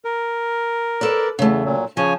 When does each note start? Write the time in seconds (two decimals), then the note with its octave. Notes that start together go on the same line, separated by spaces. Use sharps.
0.05 A#4
1.01 A4 B4 D5
1.39 E2 C#3 A3
1.65 A#2 F#3
1.97 C#3 F3 C#5 G#5